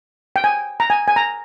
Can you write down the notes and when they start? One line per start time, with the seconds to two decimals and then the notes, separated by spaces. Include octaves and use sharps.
0.36 G5
0.44 G#5
0.80 A#5
0.90 G#5
1.08 G#5
1.16 A#5